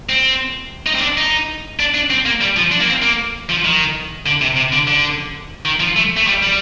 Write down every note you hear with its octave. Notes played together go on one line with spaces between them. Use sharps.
C4
D#4
C4
D4
D#4
D4
D4
C4
A#3
G3
F3
D4
A#3
C4
A#3
F3
D#3
D3
C3
C3
D3
D3
D#3
F3
A3
A3
G3
G3